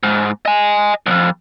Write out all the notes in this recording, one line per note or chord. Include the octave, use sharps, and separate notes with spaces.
G#2
D#5 G#5
B1 F2